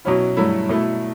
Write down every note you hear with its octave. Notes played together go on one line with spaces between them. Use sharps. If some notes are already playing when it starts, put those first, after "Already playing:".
B2 F#3 C#4 E4
G2 F#3 A3 E4
B2 A3 E4